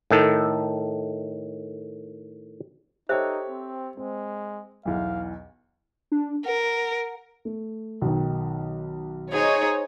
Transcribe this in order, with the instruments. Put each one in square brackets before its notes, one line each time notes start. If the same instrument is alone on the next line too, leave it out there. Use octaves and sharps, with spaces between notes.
[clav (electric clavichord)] A2 D#3 A4
[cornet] D#4 [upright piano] G4 A4 C#5 [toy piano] C5 E5
[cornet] C4
[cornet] G#3 [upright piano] C4
[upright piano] B1 E2 [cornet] F5
[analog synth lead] D4
[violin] A#4 [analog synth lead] F#5
[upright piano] A3
B1 D#3
[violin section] D#4 C5 C#5 [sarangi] G#4